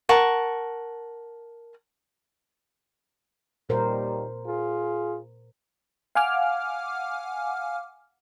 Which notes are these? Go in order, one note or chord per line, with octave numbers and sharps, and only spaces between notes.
A#4 F#5 A5 C#6
D#2 A#2 G3 A#4 C5
F4 G#4
F5 F#5 G#5 D6 F6